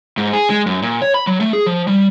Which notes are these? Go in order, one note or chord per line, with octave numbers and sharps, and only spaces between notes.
G#2
G#4
G#3
F#2
A#2
C#5
B5
F#3
A3
G#4
F3
G3